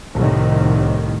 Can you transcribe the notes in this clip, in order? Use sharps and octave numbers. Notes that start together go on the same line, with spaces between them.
C2 A2 D#3